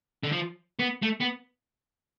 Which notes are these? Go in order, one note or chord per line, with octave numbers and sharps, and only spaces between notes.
D3
F3
B3
A3
B3